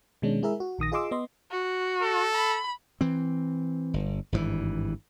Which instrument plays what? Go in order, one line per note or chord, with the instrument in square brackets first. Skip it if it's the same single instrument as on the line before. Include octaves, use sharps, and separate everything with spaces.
[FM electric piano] B2 D#3 G#3 C#4 D4
G#3 E4 G#4 A#4 E5
F#4
A#1 D#3 D#6 A#6
F4 G#4 D#5 C6 D6 E6
B3 D#5 C6
[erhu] F#4
[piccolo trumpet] A4
[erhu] B5
[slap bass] E3 C4
G1
G#1 G2 C3 E3